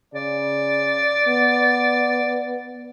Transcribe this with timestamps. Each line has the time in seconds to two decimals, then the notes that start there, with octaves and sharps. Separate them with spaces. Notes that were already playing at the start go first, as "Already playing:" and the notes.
0.14 C#3 D5
1.27 B3